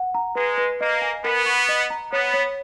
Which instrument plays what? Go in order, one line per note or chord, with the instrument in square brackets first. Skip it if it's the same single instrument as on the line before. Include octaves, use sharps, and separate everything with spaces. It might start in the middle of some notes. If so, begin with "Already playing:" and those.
Already playing: [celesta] F#5
A#5
[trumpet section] G#3 [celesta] B4
[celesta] B4
[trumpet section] A#3 [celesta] D#5
[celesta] G#5
[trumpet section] B3 [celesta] A#4
[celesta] C#6
D#5
A#5
[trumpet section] B3 [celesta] C#5
[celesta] C#5